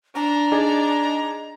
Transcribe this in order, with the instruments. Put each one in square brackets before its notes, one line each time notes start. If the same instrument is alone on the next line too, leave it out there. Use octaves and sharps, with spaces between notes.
[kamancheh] D4 [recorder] A#5
[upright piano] D#4 G#4 D5